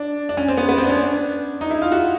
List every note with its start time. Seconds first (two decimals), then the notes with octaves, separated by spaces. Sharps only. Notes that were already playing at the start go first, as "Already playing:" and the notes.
Already playing: D4
0.29 D4
0.37 C#4
0.48 C4
0.57 B3
0.69 B3
0.78 C4
0.84 D4
0.89 C#4
0.99 D4
1.61 D#4
1.71 E4
1.82 F4
1.92 F#4